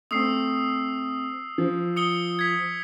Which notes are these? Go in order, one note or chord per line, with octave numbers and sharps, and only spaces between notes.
A3 C4 D#6 E6 C7
F3
D#6 C#7 G7
G#6 B6